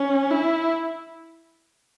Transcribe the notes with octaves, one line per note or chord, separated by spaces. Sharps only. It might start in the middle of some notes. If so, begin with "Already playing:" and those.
Already playing: C#4
E4